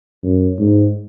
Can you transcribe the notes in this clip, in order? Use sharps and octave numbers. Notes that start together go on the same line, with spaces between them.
F#2
G#2